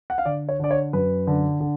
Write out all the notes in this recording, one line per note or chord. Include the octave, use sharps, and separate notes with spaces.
F#5
F5
D3 D5
C#5
D3 D5
C#5
F#2 B4
D3
D3